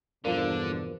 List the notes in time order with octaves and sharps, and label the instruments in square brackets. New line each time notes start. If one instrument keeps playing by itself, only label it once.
[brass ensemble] E2 G2 B2 [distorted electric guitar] D3 [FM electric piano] F3 A#3